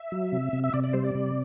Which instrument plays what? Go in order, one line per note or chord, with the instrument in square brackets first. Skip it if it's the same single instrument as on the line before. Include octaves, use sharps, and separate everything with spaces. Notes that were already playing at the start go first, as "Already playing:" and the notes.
Already playing: [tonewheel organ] E5
F#3
C3
C3
E5
C3 D5
D5
G3 C5
D5
C3